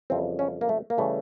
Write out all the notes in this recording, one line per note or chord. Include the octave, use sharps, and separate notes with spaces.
F2 C#3 E3 G3 C4
C#4
A#3
A3
A#3
C#3 E3 G3 A3